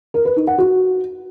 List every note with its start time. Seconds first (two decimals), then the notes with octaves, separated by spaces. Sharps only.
0.14 A#4
0.25 B4
0.36 D#4
0.47 F#5
0.58 F#4